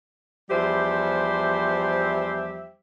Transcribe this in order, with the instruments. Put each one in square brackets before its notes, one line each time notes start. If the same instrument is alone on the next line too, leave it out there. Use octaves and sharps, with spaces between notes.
[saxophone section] E2 F3 G3 G4 C5 E5